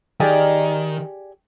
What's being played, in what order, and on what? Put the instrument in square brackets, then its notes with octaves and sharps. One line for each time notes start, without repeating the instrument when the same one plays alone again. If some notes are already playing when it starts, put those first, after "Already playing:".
[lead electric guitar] D#3 [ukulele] G4 G#4 D5